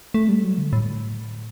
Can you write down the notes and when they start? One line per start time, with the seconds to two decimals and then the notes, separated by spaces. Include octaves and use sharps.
0.14 A3
0.29 G3
0.44 F#3
0.58 D3
0.73 A2